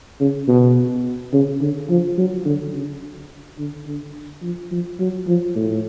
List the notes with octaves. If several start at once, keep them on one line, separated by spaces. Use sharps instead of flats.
C#3
B2
C#3
D3
F3
F#3
D3
C#3
D3
D3
F3
F3
F#3
F3
A2